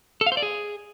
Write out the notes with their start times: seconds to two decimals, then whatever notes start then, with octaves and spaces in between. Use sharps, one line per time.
0.21 A4
0.26 F5
0.32 C5
0.37 D5
0.42 G#4